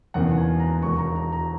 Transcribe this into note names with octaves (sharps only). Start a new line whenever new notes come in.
E1 E2 D#3 A#3 C#4 F#5
G#5
A#5
E1 D#2 D#3 G#3 C#6
A#5
A#5
A#5